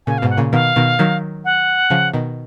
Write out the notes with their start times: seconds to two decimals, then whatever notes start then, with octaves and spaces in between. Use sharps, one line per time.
0.07 A#2 C#3 G#5
0.18 F5
0.22 G#2 B2
0.30 F#5
0.37 A#2 C#3
0.53 B2 D#3 F5
0.76 B2 D#3
0.99 D#3 F#3
1.45 F#5
1.90 C#3 F3
2.14 B2 D#3